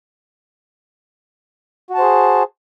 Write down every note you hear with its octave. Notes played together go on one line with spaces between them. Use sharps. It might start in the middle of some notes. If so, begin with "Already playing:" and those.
F#4 G#4 C5 A5